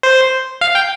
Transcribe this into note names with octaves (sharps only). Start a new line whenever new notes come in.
C5
F5
G5